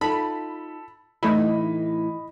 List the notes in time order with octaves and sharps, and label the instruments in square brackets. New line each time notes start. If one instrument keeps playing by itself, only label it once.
[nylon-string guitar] D#4 F4 [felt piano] A4 [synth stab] B5
[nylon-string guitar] A2 E3 [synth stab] A3 D#4 E4 [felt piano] D#5 B5